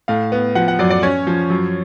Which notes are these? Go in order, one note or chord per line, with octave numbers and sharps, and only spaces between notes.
A2 F5
B3
F3 F#5
F#5
F#2 D5
D5
C#4 C#5
F3
F#2